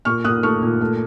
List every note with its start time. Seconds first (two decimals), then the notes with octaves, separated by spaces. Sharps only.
0.05 A#2 C#6 F6
0.24 A#2 D#6 F#6
0.43 A3 C#6 F6
0.62 A#2
0.81 A3